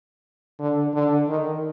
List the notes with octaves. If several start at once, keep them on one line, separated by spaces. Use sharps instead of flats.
D3
D3
D#3